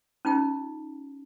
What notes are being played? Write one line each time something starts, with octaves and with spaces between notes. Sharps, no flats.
C#4 D#4 F4 G5